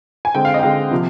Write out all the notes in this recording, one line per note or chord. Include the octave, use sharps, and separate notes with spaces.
G#5
D3 G#3 C4 G5
F5
D#5
G5
D3 G#3 C4 F5
C3 F3 A#3